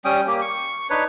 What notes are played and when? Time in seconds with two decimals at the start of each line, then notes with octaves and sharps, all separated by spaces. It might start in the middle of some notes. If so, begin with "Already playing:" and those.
0.05 G3 C#4 G5 D#6
0.27 A#3 G4
0.41 C#6
0.90 D4 D#4 B4 C#5